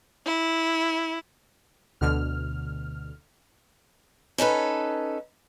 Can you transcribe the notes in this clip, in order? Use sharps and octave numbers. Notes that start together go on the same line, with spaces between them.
E4
D2 B2 D3 F6
C#4 D#4 A4 B4